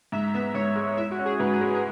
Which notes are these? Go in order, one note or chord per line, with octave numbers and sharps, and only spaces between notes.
G#2 E5
B3 E5
G#2 C#5
G#3
E4 E5
F#4
C#4
G#4
G#2 B4
G#4
G#3
G#4